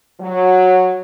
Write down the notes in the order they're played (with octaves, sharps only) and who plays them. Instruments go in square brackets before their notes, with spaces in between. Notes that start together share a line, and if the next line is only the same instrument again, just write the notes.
[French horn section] F#3